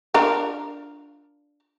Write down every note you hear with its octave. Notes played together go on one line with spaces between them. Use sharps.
D4 F4 A#4